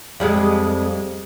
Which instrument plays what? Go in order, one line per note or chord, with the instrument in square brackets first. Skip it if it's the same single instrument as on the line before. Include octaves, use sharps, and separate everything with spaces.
[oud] F2 G3 G#3